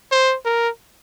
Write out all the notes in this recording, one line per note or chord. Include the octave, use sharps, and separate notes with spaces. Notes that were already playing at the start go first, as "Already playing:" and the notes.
C5
A#4